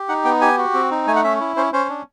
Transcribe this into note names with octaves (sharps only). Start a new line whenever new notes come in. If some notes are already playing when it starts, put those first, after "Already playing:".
Already playing: G4
D#4 F#5
B3 G5
G4 G#5
F#4
C4
D#4
A3 G#5
F#5
C#4 E5
E4
C#4 C5
C#4 C5
D4